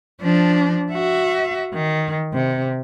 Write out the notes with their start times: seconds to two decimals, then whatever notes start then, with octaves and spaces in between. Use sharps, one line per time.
0.22 F3 D4
0.93 F#4 E5
1.74 D#3
2.34 C3